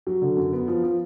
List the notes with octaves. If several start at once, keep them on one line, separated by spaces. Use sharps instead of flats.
F#3
D3
F#2
B3
F3
F3